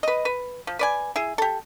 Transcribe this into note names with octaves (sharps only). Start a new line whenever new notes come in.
B4 D#5
B4
F3
B4 D5 G#5
E4 G#4
G4 A4